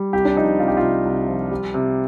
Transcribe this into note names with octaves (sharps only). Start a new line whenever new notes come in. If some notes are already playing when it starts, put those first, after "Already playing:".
Already playing: G3
C2 G4
D4
F3 D#4
C3 F4
G4
F4
C2
C2
F3
G3
C3